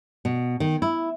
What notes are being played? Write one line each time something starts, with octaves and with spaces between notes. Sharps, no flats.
B2
D#3
E4